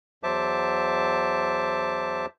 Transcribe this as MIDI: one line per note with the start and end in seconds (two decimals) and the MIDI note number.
0.23 2.26 40
0.23 2.26 54
0.23 2.26 72
0.23 2.26 76
0.23 2.26 81
0.23 2.26 86